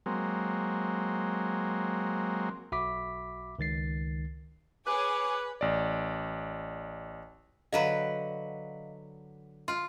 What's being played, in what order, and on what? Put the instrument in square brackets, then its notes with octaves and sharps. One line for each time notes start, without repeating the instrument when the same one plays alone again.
[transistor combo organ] F#3 G#3 A#3 C4
[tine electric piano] B1 F#4 E5 B5 D6 B6
C#2 D#3 A6 C7
[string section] G#4 C#5 G#5 [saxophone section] B4 [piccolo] D6
[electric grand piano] A1 D5
[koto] D3 F#3 B4 [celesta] D#5 F5
[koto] F4 [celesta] C6